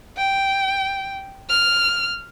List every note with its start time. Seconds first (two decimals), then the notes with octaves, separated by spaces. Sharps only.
0.17 G5
1.49 F6